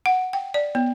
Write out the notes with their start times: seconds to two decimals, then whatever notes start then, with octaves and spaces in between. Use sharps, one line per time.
0.06 F#5
0.33 G5
0.54 D5
0.75 B3